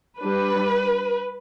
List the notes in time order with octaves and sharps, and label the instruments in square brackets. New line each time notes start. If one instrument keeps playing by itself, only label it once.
[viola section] G3 D4 B4